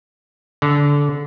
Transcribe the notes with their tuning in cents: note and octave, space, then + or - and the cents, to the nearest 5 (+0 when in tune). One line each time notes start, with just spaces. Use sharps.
D3 -20